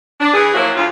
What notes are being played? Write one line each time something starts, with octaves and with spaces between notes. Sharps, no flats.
D4
E3 G#4
F3 F#3 A#3 C#4 E4 F#4
D2 C#3 F4